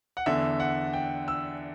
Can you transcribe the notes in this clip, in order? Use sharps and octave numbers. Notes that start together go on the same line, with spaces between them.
F#5
E2 D3 E5
F#5
G5
E6